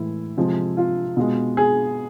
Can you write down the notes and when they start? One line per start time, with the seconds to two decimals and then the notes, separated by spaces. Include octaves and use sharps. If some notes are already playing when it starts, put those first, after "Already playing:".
Already playing: A2 E3 G#3 E4
0.37 C3 F3 G#3
0.77 F4
1.17 B2 G#3
1.57 G#4